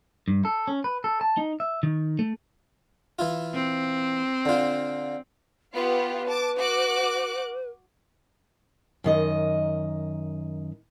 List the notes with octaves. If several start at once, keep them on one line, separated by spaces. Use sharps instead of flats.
G2
A4
C#4
B4
A4
A5
D#4
E5
D#3
A3
E3 E4 F4
C4
D3 F4
B3 F4 G4 B4
A5 D6
F#4 D6 F#6
F#2 D#3 D#5